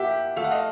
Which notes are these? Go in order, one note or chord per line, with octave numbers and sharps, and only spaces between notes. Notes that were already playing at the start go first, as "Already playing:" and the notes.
Already playing: A#3 G4 E5 F#5
A3 F5
F#5
D#5 F5